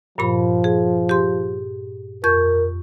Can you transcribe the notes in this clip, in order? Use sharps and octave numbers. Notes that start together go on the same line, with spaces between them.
G2 A#2 F3 B5
G#4
G4 C6
F2 A#4 C#6 G6